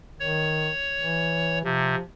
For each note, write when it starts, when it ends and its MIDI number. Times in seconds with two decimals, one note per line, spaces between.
0.20 0.69 51
0.20 1.59 73
1.00 1.61 52
1.65 1.95 48
1.65 2.02 53